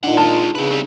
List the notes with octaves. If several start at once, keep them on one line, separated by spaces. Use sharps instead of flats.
A#2 D4 D#4 D5 F#5
G#3 F4 A5
C#3 C4 B4
G3 C4